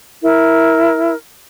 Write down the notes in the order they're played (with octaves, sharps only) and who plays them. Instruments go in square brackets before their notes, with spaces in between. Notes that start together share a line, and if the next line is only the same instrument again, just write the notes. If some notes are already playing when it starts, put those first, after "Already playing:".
[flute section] E4 A#4